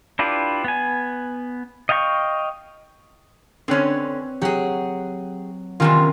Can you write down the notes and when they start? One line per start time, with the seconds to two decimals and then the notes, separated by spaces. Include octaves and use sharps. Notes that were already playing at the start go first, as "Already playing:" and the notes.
0.19 D4 E4 F4 G4 B4
0.64 B3 G#5
1.89 D#5 F5 G5 A5 C#6
3.68 D3 C4 C#4 B4 C#5
4.42 F#3 G4 G#4 F#5
5.80 E2 C3 D#3 C#4 F4 A#4